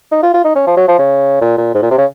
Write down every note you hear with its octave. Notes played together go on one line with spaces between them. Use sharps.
D#4
F4
F4
D#4
C#4
F3
F#3
F3
C#3
A#2
A#2
G#2
A#2
C3
C#3